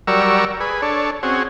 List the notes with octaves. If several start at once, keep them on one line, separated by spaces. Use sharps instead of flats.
F#3 G3 A#4 D5 C#6 E6
G#4 B4
D4 A4 C#5
C4 C#4 F#4 G#4